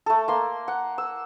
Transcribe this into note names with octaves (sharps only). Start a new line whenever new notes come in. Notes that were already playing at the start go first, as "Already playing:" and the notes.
A3 A4
A#3 C6
F#5
E6